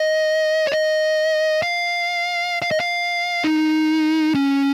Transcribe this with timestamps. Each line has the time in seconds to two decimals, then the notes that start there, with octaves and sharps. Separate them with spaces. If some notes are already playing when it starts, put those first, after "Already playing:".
Already playing: D#5
0.67 C#5
0.72 D#5
1.62 F5
2.62 F5
2.71 D#5
2.80 F5
3.44 D#4
4.35 C#4